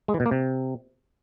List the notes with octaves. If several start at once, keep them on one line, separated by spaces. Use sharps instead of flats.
G#3
E3
B2
A#3
C3